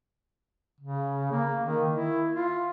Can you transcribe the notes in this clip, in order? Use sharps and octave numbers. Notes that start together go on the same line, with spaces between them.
C#3
A#3
D#3
E4
F4